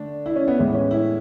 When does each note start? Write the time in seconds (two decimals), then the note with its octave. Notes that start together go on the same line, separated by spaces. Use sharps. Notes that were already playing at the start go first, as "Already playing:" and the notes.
Already playing: D3 A3 D4
0.26 E4
0.36 C#4
0.48 B3
0.59 A2 E3 G#3
0.75 C#4
0.91 E4